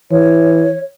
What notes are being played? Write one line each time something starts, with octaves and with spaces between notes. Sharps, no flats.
E3 C#5